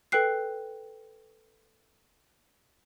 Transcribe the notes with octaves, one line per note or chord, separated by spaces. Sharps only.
A4 B4 G5 F#6 C7